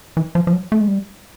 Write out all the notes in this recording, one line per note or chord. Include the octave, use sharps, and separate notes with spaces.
E3
F3
F3
F#3
A3
G#3
G3